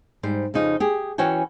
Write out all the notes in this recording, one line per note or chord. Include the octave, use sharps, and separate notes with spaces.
G#2 G3 C5
F2 C#3 D#4 F4 D#5
G4 G#4
E3 C#4 F#4 G5 G#5